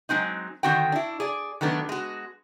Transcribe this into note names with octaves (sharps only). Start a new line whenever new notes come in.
F#3 G#3 C4 D#4
D3 D#3 C4 F#4 F#5 G5
D4 E4
G#4 D5
D#3 F#3 A3 B3 D4
G#3 F#4